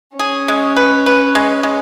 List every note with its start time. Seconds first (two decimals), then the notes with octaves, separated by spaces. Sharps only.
0.18 C#4 G#4
0.48 G#3
0.76 B4
1.06 B4
1.35 G#3
1.63 G#3